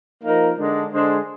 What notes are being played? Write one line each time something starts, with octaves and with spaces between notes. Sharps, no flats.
F3 A#3 D#4 A#4
D3 G#3 D4
D3 G#3 D4 G#4 C5